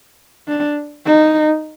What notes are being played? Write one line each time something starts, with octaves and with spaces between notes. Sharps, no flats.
D4
D#4